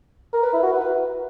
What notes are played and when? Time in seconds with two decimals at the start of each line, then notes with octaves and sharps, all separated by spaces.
0.33 A#4
0.43 B4
0.53 E4
0.63 F#4
0.73 B4